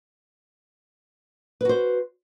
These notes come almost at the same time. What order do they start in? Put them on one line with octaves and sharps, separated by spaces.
B4 F#4 C5